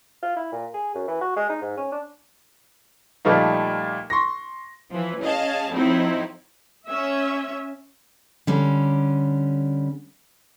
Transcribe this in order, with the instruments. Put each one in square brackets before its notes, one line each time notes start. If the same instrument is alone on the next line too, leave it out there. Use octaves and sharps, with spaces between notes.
[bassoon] F4
E4
A#2
G#4
F#2
E3
F#4
G#3
D#4
G#2
C#4
D4
[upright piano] A#2 F3 G3 A3 A#3 D#4
C6 C#6 A#6
[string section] E3 F3
C#4 G#4 D#5 F5 A5
A2 F3 C4 D#4 E4
[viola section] C#4 E5
[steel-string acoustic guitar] D3 G3 C#4